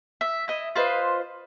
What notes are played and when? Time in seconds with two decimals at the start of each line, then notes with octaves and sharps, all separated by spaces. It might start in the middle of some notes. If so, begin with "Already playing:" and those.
0.21 E5
0.48 E4 D#5
0.75 F4 B4 C5 D#5